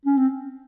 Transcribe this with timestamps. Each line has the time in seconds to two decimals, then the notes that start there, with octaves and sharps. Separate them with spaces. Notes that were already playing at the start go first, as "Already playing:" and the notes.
0.05 C#4
0.17 C4